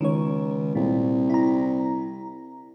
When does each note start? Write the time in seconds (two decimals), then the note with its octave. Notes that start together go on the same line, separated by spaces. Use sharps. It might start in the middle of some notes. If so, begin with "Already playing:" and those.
0.01 C#2 D#3 C#5
0.75 C2 A#2
1.30 E4 A#5